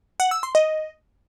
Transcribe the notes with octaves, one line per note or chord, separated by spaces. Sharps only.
F#5
E6
C6
D#5